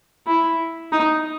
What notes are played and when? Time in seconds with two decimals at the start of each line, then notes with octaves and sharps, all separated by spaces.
0.26 E4
0.92 D#4